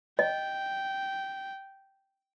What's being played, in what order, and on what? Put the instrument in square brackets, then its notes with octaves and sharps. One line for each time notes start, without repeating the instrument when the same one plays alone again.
[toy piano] D#5 [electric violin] G5